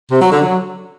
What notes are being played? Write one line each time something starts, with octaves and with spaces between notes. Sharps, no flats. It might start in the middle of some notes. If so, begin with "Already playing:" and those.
C3
F#3
D3
F#3